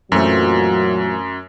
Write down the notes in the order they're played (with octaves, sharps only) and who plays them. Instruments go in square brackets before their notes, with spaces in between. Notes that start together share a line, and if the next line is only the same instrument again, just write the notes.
[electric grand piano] F#2 [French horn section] A#2 F#3 [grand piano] E3 A3 C4